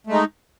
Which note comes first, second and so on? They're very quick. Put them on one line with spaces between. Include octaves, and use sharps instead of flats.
A3 G#3 D#4